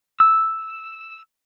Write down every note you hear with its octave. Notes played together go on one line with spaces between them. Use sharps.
E6